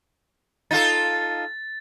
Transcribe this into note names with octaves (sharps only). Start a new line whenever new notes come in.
D#4 F4 A4 A6